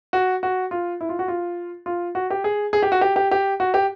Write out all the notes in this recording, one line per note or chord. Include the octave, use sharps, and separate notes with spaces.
F#4
F#4
F4
E4
F4
F#4
F4
F4
F#4
G4
G#4
G#4
G4
F#4
G4
G4
G4
F#4
G4